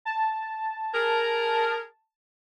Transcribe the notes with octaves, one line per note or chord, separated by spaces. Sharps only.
A5
G#4 A#4